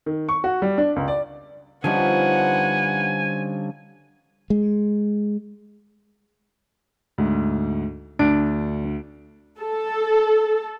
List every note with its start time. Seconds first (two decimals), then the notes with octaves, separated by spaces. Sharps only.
0.06 D#3
0.29 C#6
0.44 F#4
0.62 G3
0.78 D4
0.96 C#2
1.08 D5
1.84 D3 F3 G3 B3 C#4 D#4 F#5 G#5
4.50 G#3
7.18 D2 G#2
8.19 D2 D4 D7
9.60 A4